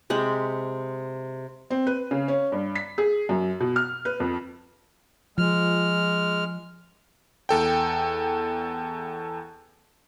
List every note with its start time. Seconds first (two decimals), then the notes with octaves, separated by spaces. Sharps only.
0.10 C3 G#3 C4 B5
1.70 C4
1.87 B4
2.11 C#3
2.28 C#4
2.52 G2
2.75 B6
2.98 G#4
3.29 F#2
3.60 B2
3.76 F6
4.05 B4
4.20 F2
5.38 F3 G#3 F6
7.49 E2 A4 G5